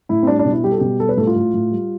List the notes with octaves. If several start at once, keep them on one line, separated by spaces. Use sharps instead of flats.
A2 E4
C4
G3 D4
D4
B2
E4
G3 G4
A4
B2 G4
G3 A4
B4
A2 A4
F4
A2
A2
G3